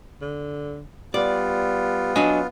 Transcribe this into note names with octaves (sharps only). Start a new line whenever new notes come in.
D3
G3 B3 F4 D5
F#3 D4 D#5 G#5